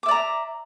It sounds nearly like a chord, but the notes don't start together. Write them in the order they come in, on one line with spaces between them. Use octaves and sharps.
D6 E5 D5 A#5